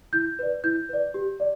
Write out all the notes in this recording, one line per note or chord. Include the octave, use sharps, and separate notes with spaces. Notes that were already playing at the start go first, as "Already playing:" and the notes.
E4 G6
B4 D5
E4 G6
B4 D5
G4
D5